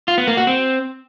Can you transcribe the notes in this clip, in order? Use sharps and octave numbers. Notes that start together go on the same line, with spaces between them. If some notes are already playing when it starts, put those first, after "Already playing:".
F4
B3
A#3
F#4
C4